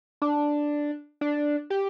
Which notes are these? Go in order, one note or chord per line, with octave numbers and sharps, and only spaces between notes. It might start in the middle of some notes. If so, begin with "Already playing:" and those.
D4
D4
G4